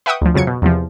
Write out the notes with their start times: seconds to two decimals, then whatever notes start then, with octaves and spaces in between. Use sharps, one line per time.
0.06 B4 E5 F#5 G5 C#6 D#6
0.21 D2 F3
0.34 F2 C#3 F#3 G#6 C#7
0.47 B2
0.62 E2 C3 F3